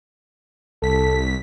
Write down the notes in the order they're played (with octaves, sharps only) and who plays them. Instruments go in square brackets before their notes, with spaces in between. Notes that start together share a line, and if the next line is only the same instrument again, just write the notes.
[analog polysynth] C2 B6 [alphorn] A4